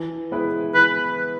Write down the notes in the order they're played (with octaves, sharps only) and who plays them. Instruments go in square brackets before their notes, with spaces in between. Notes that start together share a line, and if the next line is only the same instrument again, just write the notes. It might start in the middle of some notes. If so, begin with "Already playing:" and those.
Already playing: [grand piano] E3
G#3 B3 E4 B4
[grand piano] E3 [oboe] B4